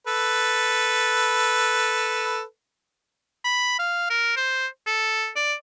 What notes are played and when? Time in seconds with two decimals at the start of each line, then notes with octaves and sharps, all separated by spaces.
0.07 A4 B4
3.44 B5
3.79 F5
4.10 A#4
4.36 C5
4.86 A4
5.36 D5